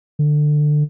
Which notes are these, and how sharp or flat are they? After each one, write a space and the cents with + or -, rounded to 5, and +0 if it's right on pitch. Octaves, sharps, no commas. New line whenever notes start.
D3 +20